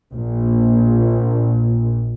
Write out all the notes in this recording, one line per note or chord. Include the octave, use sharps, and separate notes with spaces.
A#1 A#2